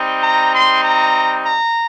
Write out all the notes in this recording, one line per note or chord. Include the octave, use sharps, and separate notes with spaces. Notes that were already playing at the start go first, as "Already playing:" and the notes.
Already playing: G3 C4 D#4
A#5
C6
A#5
A#5